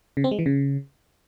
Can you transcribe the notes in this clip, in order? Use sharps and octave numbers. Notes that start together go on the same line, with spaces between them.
C#3
C4
G#3
E3
C#3